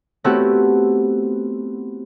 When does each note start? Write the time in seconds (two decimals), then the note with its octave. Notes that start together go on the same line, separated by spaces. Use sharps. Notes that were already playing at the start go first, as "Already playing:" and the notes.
0.24 A3 B3 C4 E4 F#4 G4